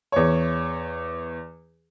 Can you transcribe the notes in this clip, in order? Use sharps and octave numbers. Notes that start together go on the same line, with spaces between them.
E2 C#5